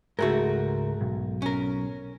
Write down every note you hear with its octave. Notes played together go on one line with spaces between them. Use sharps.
C#2 G#2 A3 F#4 A#4
B1
C#4 A#4